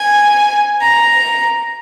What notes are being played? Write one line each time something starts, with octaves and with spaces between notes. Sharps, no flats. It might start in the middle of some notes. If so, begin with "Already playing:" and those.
Already playing: G#5
A#5